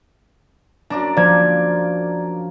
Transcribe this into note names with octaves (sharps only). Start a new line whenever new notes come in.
F#2 D4 D5 A#5
F3 A#3 D5 G#6